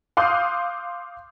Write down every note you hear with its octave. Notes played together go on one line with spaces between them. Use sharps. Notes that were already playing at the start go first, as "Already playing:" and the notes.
F5 C6 D6 D#6 F#6 G6